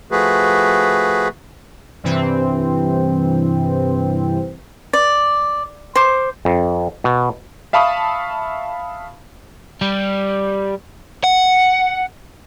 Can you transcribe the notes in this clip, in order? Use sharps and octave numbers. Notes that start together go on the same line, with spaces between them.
F3 A3 F#4 G#4 B4
G2 C3 E3 C4
D5
C5 D6
F2
B2
E5 F5 A5 B5 C#6 D#6
G3
F#5